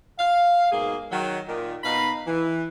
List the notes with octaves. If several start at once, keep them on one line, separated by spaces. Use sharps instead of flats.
F5
G#2 B2 A#3 G#4
D#3 F#3
A#2 D#3
B2 D#4 F5 B5
E3